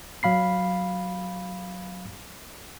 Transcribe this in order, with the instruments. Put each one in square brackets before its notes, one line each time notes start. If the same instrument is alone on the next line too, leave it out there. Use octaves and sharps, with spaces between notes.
[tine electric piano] F#3 F5 B5 C7